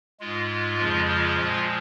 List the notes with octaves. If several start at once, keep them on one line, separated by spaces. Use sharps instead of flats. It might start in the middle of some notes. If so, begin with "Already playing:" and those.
G#2 G#3 F4
F2 C#3 F3 G#3
F4
A#2 F3 G#3